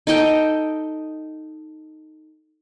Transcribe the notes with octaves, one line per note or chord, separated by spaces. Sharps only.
D#4 A4 D#5 G5